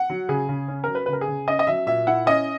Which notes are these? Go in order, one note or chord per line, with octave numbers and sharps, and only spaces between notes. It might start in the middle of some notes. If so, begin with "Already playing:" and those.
Already playing: F#5
F#3
C#3 G#4
C#3
C#4
F#3 A#4
B4
C#3 B4
A#4
G#4
C#3
C#4 D#5
D#5
F#3 E5
A#2 E5
E4 F#5
C#4 D#5